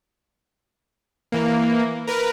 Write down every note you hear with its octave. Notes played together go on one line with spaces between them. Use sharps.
E3 A#3
A#4 B4